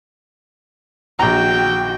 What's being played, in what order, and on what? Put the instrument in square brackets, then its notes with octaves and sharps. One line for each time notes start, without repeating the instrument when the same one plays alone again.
[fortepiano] A#1 A#5 [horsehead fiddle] F#4 G5